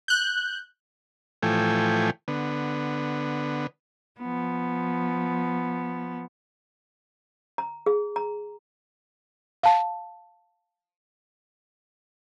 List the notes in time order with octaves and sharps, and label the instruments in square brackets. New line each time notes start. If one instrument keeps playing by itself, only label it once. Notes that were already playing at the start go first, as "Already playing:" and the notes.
[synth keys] F#6 G6
[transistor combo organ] A2 E3 F3 A3 G5 G#5
D3 B3
[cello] F3 B3
[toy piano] A#5
G#4
A#5
[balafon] F5 A5